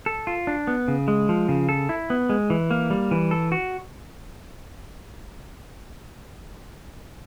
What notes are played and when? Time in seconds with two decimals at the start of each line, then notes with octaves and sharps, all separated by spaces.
0.06 A4
0.27 F4
0.47 D4
0.67 B3
0.88 C#3
1.08 G#3
1.29 F3
1.49 C#3
1.69 A4
1.89 E4
2.10 B3
2.29 G#3
2.50 E3
2.71 A#3
2.90 G3
3.11 E3
3.31 A4
3.52 F#4